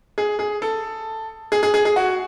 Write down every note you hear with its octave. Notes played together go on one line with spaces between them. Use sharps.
G#4
G#4
A4
G#4
G#4
G#4
G#4
F#4